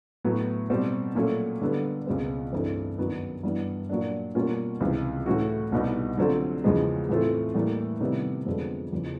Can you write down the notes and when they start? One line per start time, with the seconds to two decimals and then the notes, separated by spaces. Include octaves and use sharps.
0.24 A2 F#3 B3
0.70 B2 G3 C4
1.15 A#2 F#3 A3 C#4
1.61 D3 G3 B3
2.07 C#2 B2 G#3 C4
2.52 G2 E3 A3 C4
2.98 F#2 D#3 F#3 B3
3.43 G2 E3 G3 B3
3.89 A#2 F#3 A#3 D4
4.35 B2 G3 A#3 C#4 F4
4.80 C#2 C3 E3
5.26 A2 E3 A3 C#4 F#4
5.72 C2 B2 G3 B3 D#4
6.18 D3 F#3 A3 C4 F4
6.64 E2 C#3 F3 G#3
7.09 A2 E3 A3 C4 F4
7.55 A2 E3 G3 A#3
8.00 C3 D#3 G3 B3 E4
8.46 F2 D3 F3 G#3 B3
8.93 E2 C#3 F3